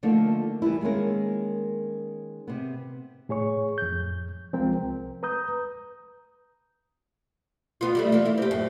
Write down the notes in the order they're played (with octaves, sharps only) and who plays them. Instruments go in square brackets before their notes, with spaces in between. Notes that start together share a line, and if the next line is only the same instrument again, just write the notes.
[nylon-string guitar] D3 F3 A3 A#3 D#4
E3 G3 B3 E4
D#3 G#3 A#3 C#4 A#4
C3 B3
[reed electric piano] A2 G#4 C#5 C#6
F2 G6
C2 F3 G#3 C4 A#4 G5
C2
B4 A#5 D#6 G6
[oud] B3 F4
G3 A3 E4
E3 A#3
E4
C4 G4
F#2 A2